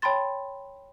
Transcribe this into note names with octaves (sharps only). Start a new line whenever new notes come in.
C#5 G5 A5 B5 C6 A6